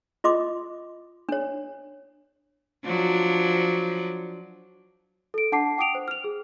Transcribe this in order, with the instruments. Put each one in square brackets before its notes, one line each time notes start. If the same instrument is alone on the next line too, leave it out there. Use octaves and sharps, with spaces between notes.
[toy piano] F4 D#5 C6 D6
D4 C#5
[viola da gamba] F3 F#3 D4
[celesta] A4 D7
D4 F#5 A5 D6 C7
G5 D6 D#6 D7 F7
C5
F6 F7
G#4